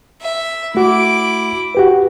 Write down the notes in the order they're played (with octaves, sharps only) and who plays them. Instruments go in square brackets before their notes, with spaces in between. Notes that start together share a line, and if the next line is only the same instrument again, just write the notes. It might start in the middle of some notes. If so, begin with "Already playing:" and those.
[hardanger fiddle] E5
[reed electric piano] A3 F#4 [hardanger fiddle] E4 D6
[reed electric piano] F#4 G4 B4